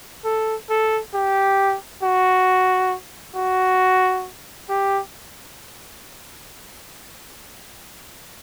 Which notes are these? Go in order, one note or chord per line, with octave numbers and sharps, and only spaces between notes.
A4
A4
G4
F#4
F#4
G4